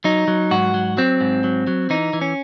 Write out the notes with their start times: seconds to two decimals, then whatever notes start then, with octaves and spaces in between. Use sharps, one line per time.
0.04 F#3 D#4
0.28 F#3
0.51 G#2 F#4
0.74 F#3
0.97 F#3 C4
1.21 G#2
1.44 F#3
1.67 F#3
1.90 E3 D#4
2.13 E3
2.21 C#4